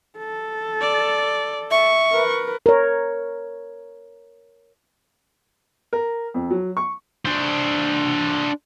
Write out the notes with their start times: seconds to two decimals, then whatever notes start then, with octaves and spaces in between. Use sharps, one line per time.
0.18 A4
0.81 D5
1.71 E5 C#6
2.12 A#4 B4
2.66 A#4 C#5
5.93 A#4
6.34 F2
6.50 F#3
6.77 C#6
7.25 D4 C5